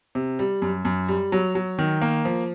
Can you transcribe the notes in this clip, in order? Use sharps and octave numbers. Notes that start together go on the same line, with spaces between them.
C3
G3
F#2
F#2
G3
F#3
F#3
D#3
A#3
F3